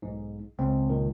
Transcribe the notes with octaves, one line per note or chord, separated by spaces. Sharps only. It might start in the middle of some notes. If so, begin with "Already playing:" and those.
B1 G#2
C#2 C4
A#2 D#3